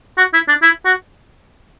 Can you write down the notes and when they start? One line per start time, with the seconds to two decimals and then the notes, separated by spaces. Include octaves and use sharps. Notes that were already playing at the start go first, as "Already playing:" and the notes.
0.18 F#4
0.33 E4
0.48 D4
0.62 E4
0.85 F#4